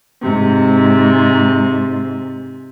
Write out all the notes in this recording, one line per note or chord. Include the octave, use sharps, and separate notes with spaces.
G#2 C3